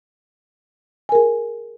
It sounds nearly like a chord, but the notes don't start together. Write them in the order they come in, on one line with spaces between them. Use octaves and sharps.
G#5 A#4 G#4